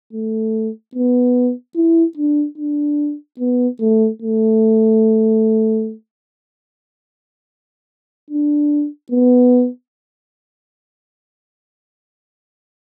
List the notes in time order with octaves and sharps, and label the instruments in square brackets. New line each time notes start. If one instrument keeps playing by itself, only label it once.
[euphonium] A3
B3
E4
D4
D4
B3
A3
A3
D4
B3